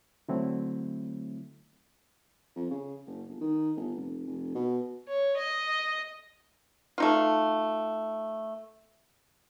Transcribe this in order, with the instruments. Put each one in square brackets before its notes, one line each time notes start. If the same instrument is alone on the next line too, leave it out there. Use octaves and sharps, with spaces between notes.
[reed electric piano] D3 F#3 A3 C4 E4
[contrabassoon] F2
C#3
F#1
G1
D#3
G1
F1
F1
B2
[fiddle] C#5
D#5
[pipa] A3 D#4 F4